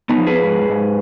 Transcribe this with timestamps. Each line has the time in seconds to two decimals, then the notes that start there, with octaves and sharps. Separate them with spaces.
0.09 B3 D#4
0.18 F3
0.26 G#4 B4
0.43 G#2
0.69 G#2